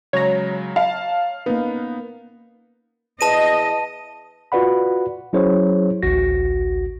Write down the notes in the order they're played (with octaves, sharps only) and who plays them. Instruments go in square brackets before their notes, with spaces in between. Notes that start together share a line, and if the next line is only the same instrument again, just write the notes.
[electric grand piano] C#3 F#3 G#3 [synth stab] C#5 A#5
[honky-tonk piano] F5 [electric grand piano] A5
[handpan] A#3 C#4 B4 [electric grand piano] B3 D#4
[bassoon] E2 [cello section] D#5 [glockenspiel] A5 D#7
[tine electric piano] F4 F#4 B4 D5 F#5 B5
F#3 C#4 E4 G#4 C5 C#5
A1 D2 F#4 A#6